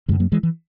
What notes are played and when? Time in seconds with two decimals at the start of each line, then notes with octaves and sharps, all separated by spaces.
0.08 F#2 C#3 E3 G#3
0.20 F#3 A#3
0.32 E3 G#3
0.43 E3